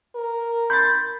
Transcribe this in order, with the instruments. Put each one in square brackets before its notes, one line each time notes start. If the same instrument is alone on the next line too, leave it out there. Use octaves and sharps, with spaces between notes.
[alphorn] A#4
[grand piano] B5 C6 A6 [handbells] G6